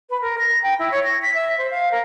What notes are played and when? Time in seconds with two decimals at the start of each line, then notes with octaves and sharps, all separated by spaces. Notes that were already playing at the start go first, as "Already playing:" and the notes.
0.09 B4
0.21 A#4
0.38 A#6
0.62 G5
0.79 E4
0.91 C#5
1.03 A#6
1.22 B6
1.34 E5
1.58 C5
1.70 F5
1.91 A#4